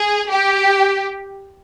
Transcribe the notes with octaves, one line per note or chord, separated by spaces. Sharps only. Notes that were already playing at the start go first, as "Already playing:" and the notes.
Already playing: G#4
G4